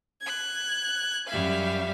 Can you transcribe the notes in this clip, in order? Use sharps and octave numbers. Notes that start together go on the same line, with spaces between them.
F#6 G#6
F#2 G3 E5 F5